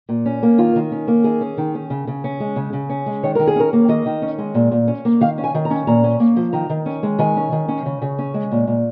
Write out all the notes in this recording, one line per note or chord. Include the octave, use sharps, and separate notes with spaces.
A#2
C#4
A#3
D#3 F4
D#3
C#4
A#3
D#3 G#4
C#4
D#3
C#4
C#3
C#3
C#4
G#3
C#3
C#3
C#4
G#3
D#3 C#5
D#3 A#4
G#4
C#4 A#4
A#3
D#3 D#5
D#3
C#4
G#3
A#2
A#2
C#4
A#3
D#3 F5
C#4
G#5
D#3
A#5
C#4
A#2 A#5
C#4
A#3
F3
D#3 A#5
D#3
C#4
G#3
D#3 G#5
C#4
D#3
C#4
C#3
C#3
C#4
G#3
A#2
A#2